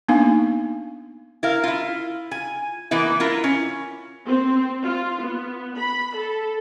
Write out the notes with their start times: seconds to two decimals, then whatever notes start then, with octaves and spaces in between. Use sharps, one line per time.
0.08 A#3 B3 D4 D#4 F5 G#5
1.43 E4 A#4 F5
1.64 E4 F4
2.31 G#5
2.91 E3 A#3 B3 E4
3.20 E4 F4 A#4
3.44 C#4
4.27 C4
4.84 F4
5.21 B3
5.78 B5
6.16 A4